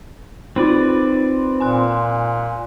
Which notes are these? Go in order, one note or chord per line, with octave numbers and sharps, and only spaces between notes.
C4 D#4 F4 B4 D5
A#2 G#5 C6 F#6